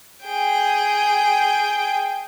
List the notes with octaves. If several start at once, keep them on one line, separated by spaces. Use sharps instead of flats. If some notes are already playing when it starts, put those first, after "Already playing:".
G#4 G5